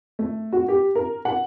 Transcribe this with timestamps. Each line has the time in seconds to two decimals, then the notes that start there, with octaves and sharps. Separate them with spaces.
0.19 A3
0.53 F#4
0.68 G4
0.95 A#4
1.25 F#5